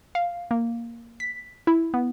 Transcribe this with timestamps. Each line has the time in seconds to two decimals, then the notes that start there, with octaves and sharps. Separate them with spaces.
0.15 F5
0.51 A#3
1.20 B6
1.67 E4
1.94 B3